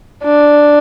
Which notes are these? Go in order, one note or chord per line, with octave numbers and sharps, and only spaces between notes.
D4